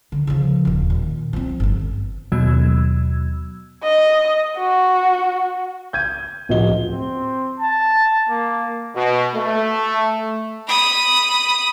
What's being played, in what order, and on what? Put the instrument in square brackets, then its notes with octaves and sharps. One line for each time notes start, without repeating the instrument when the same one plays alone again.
[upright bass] D3
C#3 F3
D#1 A#2
A#2 D#3
F3 C4
G1 F2
[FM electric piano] D#2 B2 F#3 E6 G#6
[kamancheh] D#5
F#4
[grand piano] G6 G#6 D#7
D1 F3 F#4 D#5 G7
[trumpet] C4
A5
A#3
[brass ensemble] B2
A3
[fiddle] B5 D#6